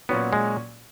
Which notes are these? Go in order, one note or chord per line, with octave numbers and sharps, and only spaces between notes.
A#2 F#3 B3 C#4 F#4
G#3